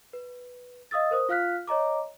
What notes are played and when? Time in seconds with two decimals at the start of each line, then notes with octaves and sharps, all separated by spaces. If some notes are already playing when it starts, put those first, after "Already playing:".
0.13 B4
0.91 D#5 F5 D#6 E6 A6
1.11 A#4 C5 D#6
1.29 F4 F5 F6 F#6 B6
1.67 C#5 D#5 A#5 D6